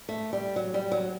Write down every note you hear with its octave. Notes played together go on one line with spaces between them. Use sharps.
A3
G3
F#3
G3
F#3